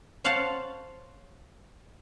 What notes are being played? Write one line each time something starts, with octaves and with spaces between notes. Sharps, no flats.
C5 C#5 F5 F#5 A5